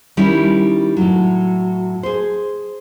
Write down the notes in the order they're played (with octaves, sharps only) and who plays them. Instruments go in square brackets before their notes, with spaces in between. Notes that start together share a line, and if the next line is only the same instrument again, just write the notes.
[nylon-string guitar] D#3 G3 C#4 D#4 E4
A2 F#3
G#4 C5